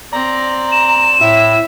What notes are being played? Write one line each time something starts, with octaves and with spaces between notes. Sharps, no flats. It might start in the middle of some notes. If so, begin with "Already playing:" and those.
C4 D5 A#5
E7
A2 E4 E5